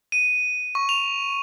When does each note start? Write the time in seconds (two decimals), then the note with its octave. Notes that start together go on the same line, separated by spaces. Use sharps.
0.12 D#7
0.75 C#6
0.89 F7